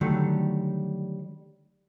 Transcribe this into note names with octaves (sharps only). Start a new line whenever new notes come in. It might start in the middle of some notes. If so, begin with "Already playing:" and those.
D3 D#3 F#3 G3 A3